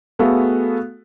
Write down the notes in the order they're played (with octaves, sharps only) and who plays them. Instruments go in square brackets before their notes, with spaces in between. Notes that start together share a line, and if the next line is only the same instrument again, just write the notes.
[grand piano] A3 B3 F#4 G#4 A4 F5